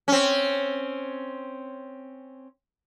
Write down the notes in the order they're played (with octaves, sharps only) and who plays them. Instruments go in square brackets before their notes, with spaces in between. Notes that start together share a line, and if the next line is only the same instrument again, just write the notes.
[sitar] C4 C#4